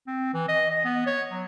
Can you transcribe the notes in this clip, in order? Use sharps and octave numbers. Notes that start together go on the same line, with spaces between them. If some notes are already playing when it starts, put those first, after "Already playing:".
C4
E3
D#5
D#5
B3
C#5
F#3